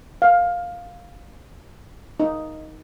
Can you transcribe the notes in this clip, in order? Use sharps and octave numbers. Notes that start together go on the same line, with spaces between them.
F5
D#4